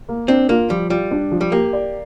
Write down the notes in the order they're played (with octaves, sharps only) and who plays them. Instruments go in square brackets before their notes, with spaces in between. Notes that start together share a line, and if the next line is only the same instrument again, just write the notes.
[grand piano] A#3
[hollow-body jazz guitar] C4 [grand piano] D4
[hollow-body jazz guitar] A#3 [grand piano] F4
[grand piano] F3 [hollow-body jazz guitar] G3
[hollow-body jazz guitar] G3 [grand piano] F4
[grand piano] D4
F3
[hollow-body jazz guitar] G3
[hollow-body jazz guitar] A#3 [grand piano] G4
[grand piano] D5